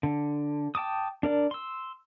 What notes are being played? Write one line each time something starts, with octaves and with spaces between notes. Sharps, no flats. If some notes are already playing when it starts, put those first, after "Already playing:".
D3
G5 A5 D6 D#6
D4 A#4 D5
C6 E6